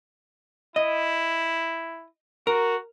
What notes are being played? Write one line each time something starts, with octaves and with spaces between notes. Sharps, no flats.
E4 D#5
F#4 A#4